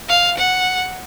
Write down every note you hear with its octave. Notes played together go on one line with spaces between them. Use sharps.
F5
F#5